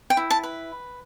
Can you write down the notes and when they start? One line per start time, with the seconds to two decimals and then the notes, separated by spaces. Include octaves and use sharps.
0.10 G5
0.17 E4
0.30 A5
0.43 B4